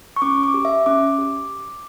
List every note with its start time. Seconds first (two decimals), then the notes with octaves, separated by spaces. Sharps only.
0.16 C#6
0.22 C#4 D6
0.43 D6
0.54 G4
0.65 E5
0.86 C#4 D6
1.18 G4